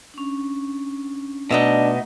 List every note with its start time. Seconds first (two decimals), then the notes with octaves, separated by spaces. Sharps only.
0.14 C#4 D4
1.51 B2 A3 D4 D#4 D#5 E5